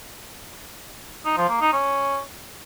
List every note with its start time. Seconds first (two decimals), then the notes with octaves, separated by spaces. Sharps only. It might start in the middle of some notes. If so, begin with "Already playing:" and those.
1.25 D#4
1.37 F3
1.49 A#3
1.61 D#4
1.73 C#4